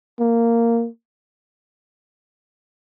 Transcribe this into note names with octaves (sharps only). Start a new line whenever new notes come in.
A#3